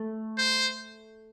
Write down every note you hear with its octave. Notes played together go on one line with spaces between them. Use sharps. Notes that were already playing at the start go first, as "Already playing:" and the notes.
Already playing: A3
C5